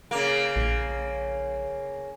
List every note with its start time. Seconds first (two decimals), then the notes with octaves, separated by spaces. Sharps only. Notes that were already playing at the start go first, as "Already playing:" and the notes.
0.11 C#3 A#3
0.56 A#1